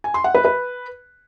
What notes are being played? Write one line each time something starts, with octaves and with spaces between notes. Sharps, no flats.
G#5
C6
F#5
B4
B4